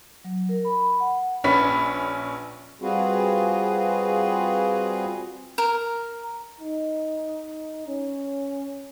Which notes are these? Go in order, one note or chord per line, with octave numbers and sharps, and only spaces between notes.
F#3
A#4
B5
F#5
A#1 C#4 B4 B5 B6
G3 C4 F4 F#4 G#4 B4
A#4
D#4
C#4